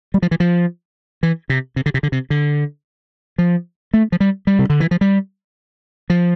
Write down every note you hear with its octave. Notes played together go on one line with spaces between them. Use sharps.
G3
F3
E3
F3
E3
C3
C3
D3
C3
D3
C3
D3
F3
A3
F3
G3
G3
C3
D3
E3
F3
G3
F3